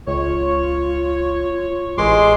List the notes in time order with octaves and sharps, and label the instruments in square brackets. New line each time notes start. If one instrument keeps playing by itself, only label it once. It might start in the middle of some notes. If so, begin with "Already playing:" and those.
[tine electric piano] C#2 [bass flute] F4 [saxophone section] C#5
[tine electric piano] A1 B4 [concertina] G#3 C6 D6